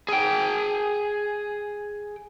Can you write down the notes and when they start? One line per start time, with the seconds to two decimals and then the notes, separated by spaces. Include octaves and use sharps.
0.08 G#4 G5